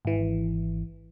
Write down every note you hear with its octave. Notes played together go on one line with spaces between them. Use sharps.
G#1 E3